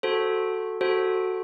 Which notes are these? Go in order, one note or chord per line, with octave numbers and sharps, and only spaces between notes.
F#4 A4 C5
F#4 A4 C5